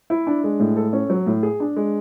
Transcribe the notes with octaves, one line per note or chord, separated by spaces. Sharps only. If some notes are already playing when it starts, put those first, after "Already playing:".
E4
D4
G#3
A2
A4
C#4
F#3
A2
G#4
D4
G#3